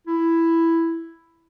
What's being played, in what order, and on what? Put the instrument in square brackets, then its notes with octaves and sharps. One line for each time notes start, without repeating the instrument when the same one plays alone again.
[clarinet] E4